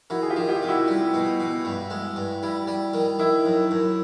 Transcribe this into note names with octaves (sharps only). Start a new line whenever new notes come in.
D#3 E4 F#4
G#4
F4 G4
D#3
F4 G4
C3
E4 F#4
G3
B2
B2
G2
G#3
G2
G3 E4
G3
D#3
D#3 E4
F#2
F#2